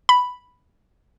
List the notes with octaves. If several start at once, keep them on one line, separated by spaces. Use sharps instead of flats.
B5